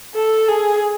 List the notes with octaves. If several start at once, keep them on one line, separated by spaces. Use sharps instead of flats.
A4
G#4